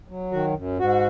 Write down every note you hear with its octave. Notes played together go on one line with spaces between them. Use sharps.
F#3
D#3 F#4
F#2
G#2 F#4